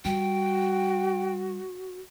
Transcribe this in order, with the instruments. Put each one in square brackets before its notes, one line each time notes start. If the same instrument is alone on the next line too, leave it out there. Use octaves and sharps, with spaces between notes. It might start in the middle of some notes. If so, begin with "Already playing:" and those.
[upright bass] G3 [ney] F#4 [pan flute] G5